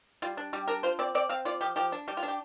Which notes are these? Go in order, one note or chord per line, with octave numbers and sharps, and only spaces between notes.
G3 F4
D4
G3 G4
D4 A#4
F4 C5
C4 D5
C4 D5
C4 F5
F4 D5
F3 G4
F3 G4
D4
G3 G4
F4
D4
G4